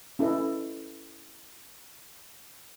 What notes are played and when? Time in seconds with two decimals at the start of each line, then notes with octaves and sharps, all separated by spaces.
0.19 C#4 E4 A4 B4 D#5